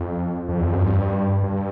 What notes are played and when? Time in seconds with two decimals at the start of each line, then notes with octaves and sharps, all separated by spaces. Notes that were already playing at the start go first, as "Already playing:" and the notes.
Already playing: F2
0.49 F2
0.60 E2
0.65 F2
0.73 F#2
0.81 G2
1.44 G2